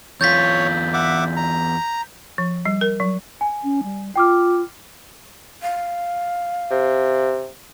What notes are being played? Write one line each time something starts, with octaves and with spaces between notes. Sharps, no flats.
E2 F4 C#5 G6 A6 B6
E5 F#5 D6
A#5
F3
G3
A#4
F#3
G#5
C#4
G3
F4 G5 D6 F6
F5
C3